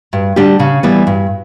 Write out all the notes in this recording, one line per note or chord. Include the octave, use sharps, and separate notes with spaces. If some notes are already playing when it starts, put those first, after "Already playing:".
G2
D3 G3 D4 G4
C#3
E3 G3 B3
G2